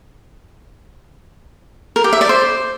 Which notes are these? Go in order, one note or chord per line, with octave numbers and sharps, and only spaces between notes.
A#4
G4
E5
D5
C5